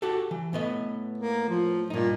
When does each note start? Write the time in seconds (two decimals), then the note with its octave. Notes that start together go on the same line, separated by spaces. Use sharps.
0.02 F#4 G4 A4
0.31 E3
0.53 A2 B3 D#5
1.18 A#3
1.49 F3
1.90 G2 A#2 D#4